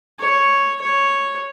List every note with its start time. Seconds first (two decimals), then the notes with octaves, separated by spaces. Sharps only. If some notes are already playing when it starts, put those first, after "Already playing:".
0.19 C#5
0.81 C#5